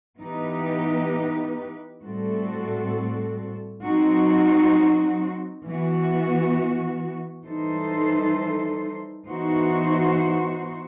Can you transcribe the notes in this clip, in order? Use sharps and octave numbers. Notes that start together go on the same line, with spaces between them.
E3 B3 D#4 G4 B4
A2 G3 C4 F#4 A4
F#3 C4 D#4 F#4
E3 B3 F#4
E3 G3 D#4 A4 C5
E3 B3 D#4 F#4 C5